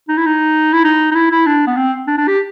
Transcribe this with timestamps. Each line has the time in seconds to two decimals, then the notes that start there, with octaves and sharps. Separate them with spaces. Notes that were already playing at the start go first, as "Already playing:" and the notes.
0.09 D#4
0.18 E4
0.26 D#4
0.73 E4
0.85 D#4
1.11 D#4
1.15 E4
1.31 E4
1.47 D4
1.67 B3
1.77 C4
2.08 D4
2.18 D4
2.28 G4